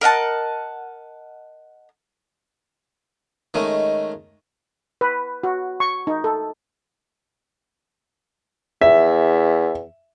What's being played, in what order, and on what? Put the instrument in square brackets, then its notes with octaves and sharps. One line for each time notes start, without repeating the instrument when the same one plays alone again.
[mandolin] A#4 D#5 F#5 A5
[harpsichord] D#3 G#3 A3 C#4
[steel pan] B4
F#4
C#6
D#4
A4
[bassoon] E2 [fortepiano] E5